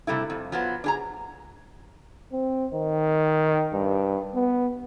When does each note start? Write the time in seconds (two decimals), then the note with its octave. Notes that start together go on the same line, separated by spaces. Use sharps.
0.07 C3 G3 A3 E4
0.30 F2
0.52 F3 F#3 B3
0.84 D4 G#4 A#5
2.33 C4
2.74 D#3
3.74 G2
4.35 B3